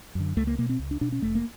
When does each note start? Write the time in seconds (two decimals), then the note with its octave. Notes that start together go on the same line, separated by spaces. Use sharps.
0.15 F#2 D3
0.36 C#2 A3
0.47 A#3
0.58 B2 A#3
0.69 C4
0.79 C#2
0.91 D4
1.01 B2 D4
1.12 C#4
1.22 F1 A3
1.35 A#3